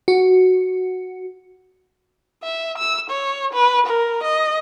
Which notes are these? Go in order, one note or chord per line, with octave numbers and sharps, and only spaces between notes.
F#4
E5
E6
C#5
B4
A#4
D#5